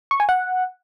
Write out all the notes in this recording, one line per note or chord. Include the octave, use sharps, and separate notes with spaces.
C#6
G#5
F#5